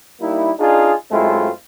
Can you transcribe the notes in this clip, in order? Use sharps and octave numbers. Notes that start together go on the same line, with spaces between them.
G3 A#3 D#4 E4
D4 D#4 F4 G#4
F#2 G#3 A3 C4 E4 F4